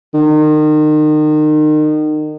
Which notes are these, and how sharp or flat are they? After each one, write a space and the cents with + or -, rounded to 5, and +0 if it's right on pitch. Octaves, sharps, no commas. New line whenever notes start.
D#3 -30